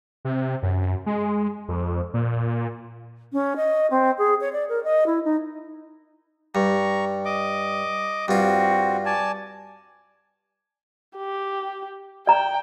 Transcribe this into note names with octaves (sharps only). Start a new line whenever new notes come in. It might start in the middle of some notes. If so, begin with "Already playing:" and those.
C3
F#2
G#3
F2
A#2
C#4
D#5
C4
G#4
C#5
D5
A#4
D#5
E4
D#4
G2 A#5 C#6
D#5 D6
G2 C4 F4 F#4
D5 G#5 A5
G4
D5 G5 A#5